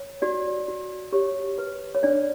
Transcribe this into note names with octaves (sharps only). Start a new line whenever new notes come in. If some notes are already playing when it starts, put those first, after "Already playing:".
Already playing: C#5
F#4 D5
F#4
G4 C#5
B4
C#5
D4 D5